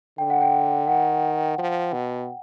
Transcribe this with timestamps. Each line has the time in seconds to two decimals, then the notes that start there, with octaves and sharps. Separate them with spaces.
0.18 D3 G5
0.30 F#5
0.41 G5
0.88 D#3 F#5
1.58 F3
1.93 B2